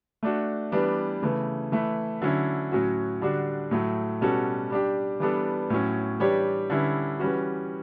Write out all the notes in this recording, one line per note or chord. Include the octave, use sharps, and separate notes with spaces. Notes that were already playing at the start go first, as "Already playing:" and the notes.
A3 D4 F#4
E3 G3 B3 D4
C#3 E3 A3
E3 A3 E4 B4
D3 F#3 C#4 E4
A2 F#3 C#4 F#4
D3 G3 D4 F#4
A2 F#3 A3
B2 G3 C#4 F#4 A4
G3 D4 G4
E3 G3 B3 D4 A4
A2 F#3 C#4
E3 G3 D4 G4 C#5
D3 G3 C#4 E4 B4
E3 G3 C#4 F#4